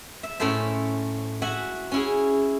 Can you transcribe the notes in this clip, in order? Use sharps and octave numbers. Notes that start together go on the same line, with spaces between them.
E5
A2 C#4 A4 C5 E5
F#4 E5 F#5 G#5
C#4 E4 G#4